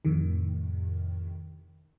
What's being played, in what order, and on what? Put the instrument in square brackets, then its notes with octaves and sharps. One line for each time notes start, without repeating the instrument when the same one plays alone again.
[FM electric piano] F2 A2 C3 D#3